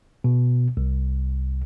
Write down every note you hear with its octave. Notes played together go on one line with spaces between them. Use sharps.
B2
C2